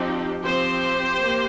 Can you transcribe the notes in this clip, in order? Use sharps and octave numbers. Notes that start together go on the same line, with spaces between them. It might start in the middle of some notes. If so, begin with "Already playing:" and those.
Already playing: F3 C4 D#4 G4
F3 C4 G4 C5
A#3